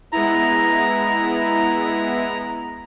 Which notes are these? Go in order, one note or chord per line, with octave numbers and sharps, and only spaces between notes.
G#3 B3 E4 A#5